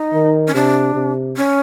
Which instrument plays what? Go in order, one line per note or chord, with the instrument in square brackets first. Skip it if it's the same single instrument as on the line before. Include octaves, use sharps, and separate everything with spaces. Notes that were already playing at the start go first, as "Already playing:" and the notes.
Already playing: [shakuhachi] D#4
[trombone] D#3
[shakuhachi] C#4
[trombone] C3 [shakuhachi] D4
[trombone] C3
[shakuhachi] C#4